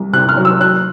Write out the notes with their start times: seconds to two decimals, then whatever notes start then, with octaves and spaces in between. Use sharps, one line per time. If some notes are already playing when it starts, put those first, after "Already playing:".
Already playing: C2
0.13 C3 F#6
0.29 F6
0.37 F#3
0.45 E6
0.60 F#3 F#6